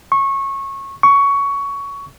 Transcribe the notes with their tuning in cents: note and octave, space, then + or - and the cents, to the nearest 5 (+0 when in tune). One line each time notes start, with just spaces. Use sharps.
C#6 -20
C#6 +15